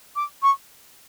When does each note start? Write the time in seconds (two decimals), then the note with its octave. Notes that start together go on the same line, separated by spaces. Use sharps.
0.16 D6
0.42 C#6